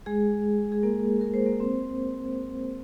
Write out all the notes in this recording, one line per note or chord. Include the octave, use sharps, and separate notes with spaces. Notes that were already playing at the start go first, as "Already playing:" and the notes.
G#3 G#4
G#4
A#3 A#4
A#4
C5
A#3 A#4
C4 C5